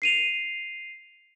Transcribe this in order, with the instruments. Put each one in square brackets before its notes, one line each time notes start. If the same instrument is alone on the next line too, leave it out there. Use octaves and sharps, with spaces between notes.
[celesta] C7 D#7 F7